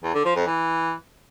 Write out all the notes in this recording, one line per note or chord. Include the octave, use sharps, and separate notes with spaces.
E2
D3
F3
F2
E3